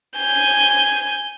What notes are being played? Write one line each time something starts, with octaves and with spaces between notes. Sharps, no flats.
G#5 G6